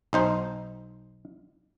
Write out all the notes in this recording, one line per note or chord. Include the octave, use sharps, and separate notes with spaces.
B1 D#4 C5